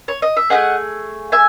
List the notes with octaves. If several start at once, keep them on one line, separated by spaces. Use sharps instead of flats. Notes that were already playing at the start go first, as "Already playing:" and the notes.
C#5
D#5
E5
A3 C#4 G#4 D#5 F#5
E5 G#5